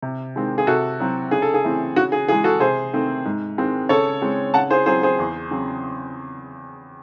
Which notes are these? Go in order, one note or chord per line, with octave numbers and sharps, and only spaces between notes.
C3
D#3 G#3 C4
G#4
C3 F#4 A4
F#3 C4
C#3 G#4
A4
G#4
E3 A3 C4
C#3 F#4
G#4
E3 G#3 G#4
F#4 A4
C3 G#4 C5
D#3 A3 C4
G#2
D#3 G#3 C4
C#3 A4 C#5
G#3 C4
C#3 F#5 A5
G#4 C5
F#3 C4 G#4 C5
G#4 C5
E2
C#3 F#3 C4